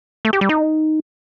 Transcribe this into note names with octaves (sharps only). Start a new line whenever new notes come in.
A3
G4
G3
D#4